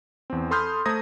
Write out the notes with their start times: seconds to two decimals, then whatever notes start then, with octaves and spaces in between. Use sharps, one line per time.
0.30 E2 C4
0.51 A4 B5 C6 D#6 F6 G6
0.86 A3 C5 A#5 D#6 G#6 A#6